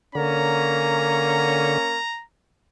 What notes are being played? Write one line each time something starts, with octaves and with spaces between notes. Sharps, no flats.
D3 A#3 C#4 A#5